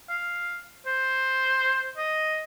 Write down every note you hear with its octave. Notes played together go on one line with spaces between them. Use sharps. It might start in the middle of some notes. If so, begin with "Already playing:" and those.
F5
C5
D#5